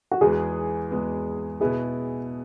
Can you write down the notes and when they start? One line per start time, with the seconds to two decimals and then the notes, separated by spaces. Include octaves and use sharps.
0.11 F#4
0.21 E2 E3 G#3 B3 G#4
0.91 E2 E3 G#3 B3
1.61 B2 B3 E4 G#4